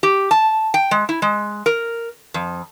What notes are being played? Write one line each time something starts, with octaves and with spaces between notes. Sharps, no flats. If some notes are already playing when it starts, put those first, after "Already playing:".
G4
A5
G5
G#3
E4
G#3
A#4
F2